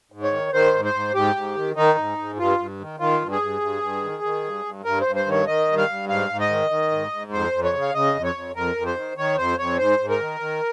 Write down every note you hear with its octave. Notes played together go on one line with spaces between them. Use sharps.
G#2
C#5
D#3
D#3 C5
G#2
C5
G#2
G#2 G4
G#2
D#3
D#3 D#4
G#2
G#2
G2 F4
G2
D#3
D#3 F4
G2
G#4
G2
G2
G2
D#3
D#3
G2
G2
G2 A#4
C5
G2
C5
D#3 C#5
D#3 D#5
G2
F5
G2
G#2 F5
G#2
D#5
D#3
D#3
G#2
G#2
F2 C5
F2
C#5
C#3
F5
C#3 D#5
F2
C#5
F2
F2 A#4
F2
C5
D#3
D#3 C#5
F2 C5
F2 C#5
G#2 C5
G#2
A#4
D#3
D#3